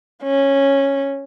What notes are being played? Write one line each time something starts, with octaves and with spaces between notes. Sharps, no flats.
C#4